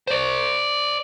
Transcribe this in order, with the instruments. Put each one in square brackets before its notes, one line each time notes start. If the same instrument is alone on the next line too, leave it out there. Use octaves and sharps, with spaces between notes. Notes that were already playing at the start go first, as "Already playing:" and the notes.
[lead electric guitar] C5 D5